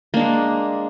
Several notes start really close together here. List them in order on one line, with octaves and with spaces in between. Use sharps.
A#3 D4 G#3